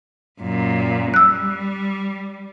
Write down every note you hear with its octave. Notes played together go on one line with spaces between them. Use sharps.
F#2 A#2
G3 E6 F#6